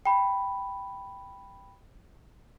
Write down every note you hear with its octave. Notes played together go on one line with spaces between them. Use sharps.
G5 B5